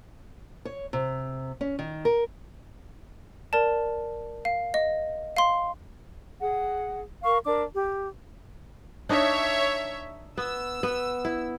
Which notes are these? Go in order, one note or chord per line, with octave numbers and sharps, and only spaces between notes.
C#5
C3
C#4
D#3
A#4
A#4 D5 A5
F5
D#5
F5 C6
G#4 F#5
A#4 F5 C#6
D4 A#4 D6
G4
D4 D#4 C#5 E5
B3 E6
B3
E4